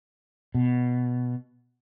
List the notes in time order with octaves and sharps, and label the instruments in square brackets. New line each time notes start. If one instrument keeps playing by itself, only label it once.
[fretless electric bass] B2